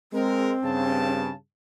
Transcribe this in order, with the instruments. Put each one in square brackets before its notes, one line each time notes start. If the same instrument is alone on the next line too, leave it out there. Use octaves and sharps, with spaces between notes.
[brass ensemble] G#3 A#4 [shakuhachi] C4
[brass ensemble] G2 C#3 A5